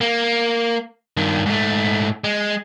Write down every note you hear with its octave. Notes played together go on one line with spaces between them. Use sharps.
A#3
G2 D#3
G#2 A3
G#3